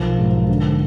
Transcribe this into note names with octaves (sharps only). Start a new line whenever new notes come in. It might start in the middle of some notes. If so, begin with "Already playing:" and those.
Already playing: B1 F3 A#4
G#2
D3